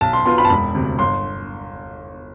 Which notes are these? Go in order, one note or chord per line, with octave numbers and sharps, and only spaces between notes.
B1 A5
C6
B2 B3 F4 C6
B5
A5
E1 B5
D2 C3
G1 C6